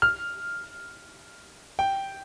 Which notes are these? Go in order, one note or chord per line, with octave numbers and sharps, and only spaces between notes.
F6
G5